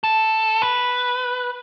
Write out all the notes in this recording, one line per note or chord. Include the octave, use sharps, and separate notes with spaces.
A4
B4